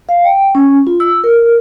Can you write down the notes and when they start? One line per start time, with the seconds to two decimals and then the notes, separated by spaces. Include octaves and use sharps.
0.09 F5
0.24 G5
0.55 C#4
0.87 F4
1.00 E6
1.24 A#4